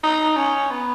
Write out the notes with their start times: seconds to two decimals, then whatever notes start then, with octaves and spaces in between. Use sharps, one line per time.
0.04 D#4
0.37 C#4
0.70 B3